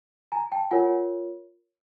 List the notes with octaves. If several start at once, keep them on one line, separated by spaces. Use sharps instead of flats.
G#5 A#5
G5 A5
F4 A#4 C#5 F#5 G#5